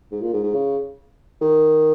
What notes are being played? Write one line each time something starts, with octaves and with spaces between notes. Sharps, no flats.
G#2
A#2
G#2
G#2
C#3
D#3